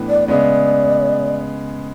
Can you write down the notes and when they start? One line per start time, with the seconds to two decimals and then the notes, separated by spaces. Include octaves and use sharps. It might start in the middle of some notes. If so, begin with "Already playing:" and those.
Already playing: A2 E3 B3 D4
0.09 D5
0.28 C#3 G#3 B3 D5